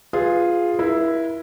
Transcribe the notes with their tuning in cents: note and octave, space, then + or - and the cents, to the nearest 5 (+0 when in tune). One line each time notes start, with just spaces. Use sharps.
F4 +0 G#4 -5 B4 +0
E4 +0 A#4 +45